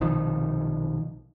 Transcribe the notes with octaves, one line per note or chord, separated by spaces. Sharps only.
B1 C3 D#3 F3